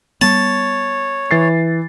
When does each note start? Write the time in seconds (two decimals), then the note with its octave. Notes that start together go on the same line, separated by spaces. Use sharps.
0.21 G3 B3 C#5 A5
1.31 E3 A6 C7